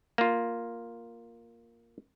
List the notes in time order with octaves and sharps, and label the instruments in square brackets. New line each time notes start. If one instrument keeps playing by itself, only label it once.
[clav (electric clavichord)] A#3 F4